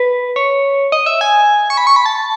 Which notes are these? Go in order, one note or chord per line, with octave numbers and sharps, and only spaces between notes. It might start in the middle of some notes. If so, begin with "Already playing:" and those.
Already playing: B4
C#5
D#5
E5
G#5
C#6
B5
C#6
B5
A5